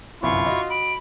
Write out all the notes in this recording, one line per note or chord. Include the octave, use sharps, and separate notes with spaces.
G1 C2 F#2 E4 F4 C#6
F#4 D#5
B5 D7